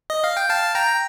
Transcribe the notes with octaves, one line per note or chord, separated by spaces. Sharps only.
D#5
F5
G5
F5 A5
G5 A#5